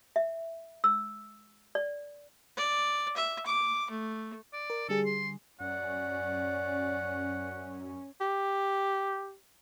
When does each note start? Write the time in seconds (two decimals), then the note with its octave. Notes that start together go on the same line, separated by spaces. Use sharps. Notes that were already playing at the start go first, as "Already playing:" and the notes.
0.16 E5
0.84 E6
1.75 D5
2.57 D5
3.16 E5
3.46 D6
3.90 A3
4.53 D5
4.70 A#4
4.89 D3 G3 G#4 A4
5.06 C6
5.60 F#2 C#4 D5 F#5
8.21 G4